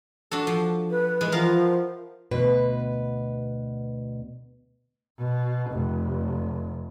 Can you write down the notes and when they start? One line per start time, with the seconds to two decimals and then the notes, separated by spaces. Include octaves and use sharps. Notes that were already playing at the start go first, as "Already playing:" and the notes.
0.31 D4 F#4 A4
0.47 F3
0.91 B4
1.21 E3 G#3
1.32 F3 B3 A#4 F5
2.31 D2 B2 B4
5.19 B2
5.71 F1